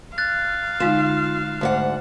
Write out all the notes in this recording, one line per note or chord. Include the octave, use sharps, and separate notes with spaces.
F5 F#6 A6
D3 G#3 D#4 F4 E7
D2 G#2 F#5